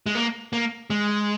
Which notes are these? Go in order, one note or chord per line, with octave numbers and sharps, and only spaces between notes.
G#3
A#3
A#3
G#3